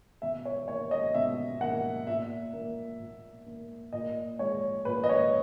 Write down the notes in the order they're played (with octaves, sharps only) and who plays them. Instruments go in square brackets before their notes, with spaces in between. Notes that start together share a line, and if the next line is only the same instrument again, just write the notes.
[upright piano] B2 E5
C#5
A#3 C#5
D#5
B2 E5
A#3 F#5
A#2 E5
A#3
A#2
A#3
A#2 D#5
G#3 C#5
A#2 B4
D#5
C#5